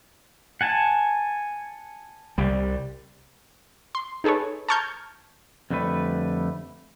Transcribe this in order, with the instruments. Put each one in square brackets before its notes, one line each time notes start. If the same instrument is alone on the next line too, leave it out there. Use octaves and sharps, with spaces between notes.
[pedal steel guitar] F#5 G#5 A5
[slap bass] C2 G3
[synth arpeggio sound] C6
D#4 G#4 A4 B4 C#5
A5 A#5 C#6 F6 G6 G#6
[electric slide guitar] F2 D3 G3 A3 B4